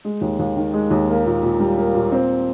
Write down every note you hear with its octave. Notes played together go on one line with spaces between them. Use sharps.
G#3
D#2
D#2
D#3
G#3
D#2
A#3
A#2
A#2
G3
A#3
A#2
C4